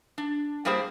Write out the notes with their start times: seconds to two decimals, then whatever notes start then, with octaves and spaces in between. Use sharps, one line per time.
0.18 D4
0.65 A2 G3 A#3 G4 G#4 C5